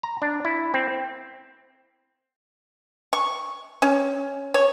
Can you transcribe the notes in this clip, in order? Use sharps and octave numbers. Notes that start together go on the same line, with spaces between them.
A#5
D4
E4
C4
C#6
C#4
C#5